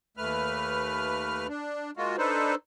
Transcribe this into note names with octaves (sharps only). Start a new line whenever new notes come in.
D#2 A3 B4 F6
D4
G#3 A#3 F4 F#4
D4 D#4 A4 B4 C5